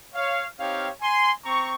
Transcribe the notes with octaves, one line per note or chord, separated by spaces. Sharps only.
C#5 F5
C4 D#4 G4 C#5 F5
G#5 C6
C4 A#5 C#6